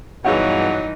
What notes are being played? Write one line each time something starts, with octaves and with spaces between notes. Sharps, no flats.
G2 B2 E3 F#3 D#4 G#4 F5 F#5